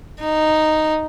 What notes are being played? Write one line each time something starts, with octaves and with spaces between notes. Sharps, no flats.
D#4